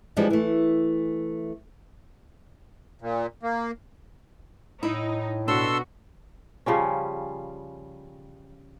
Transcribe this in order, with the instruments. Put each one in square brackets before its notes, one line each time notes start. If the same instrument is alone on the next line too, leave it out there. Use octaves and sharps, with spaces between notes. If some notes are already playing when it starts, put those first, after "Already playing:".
[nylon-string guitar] E3 F3 G3 G#3 D4
E3 A3
[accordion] A#2
A#3
[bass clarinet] A2 [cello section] D#4 [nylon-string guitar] E4
[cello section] B2 F#4 [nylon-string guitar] D4 [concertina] A4 C6 E6
[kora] C#3 F3 G3 C#4